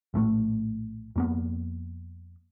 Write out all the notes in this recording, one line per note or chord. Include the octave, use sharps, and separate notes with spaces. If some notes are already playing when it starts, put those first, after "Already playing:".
A#1 A2 D3 A3
F2 A#3 B3